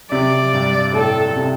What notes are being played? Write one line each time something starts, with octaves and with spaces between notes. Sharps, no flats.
C3 D5
G2
A2 A4
C3